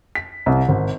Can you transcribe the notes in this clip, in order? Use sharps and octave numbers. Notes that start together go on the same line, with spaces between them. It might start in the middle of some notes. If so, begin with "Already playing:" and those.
B6
C2
G#1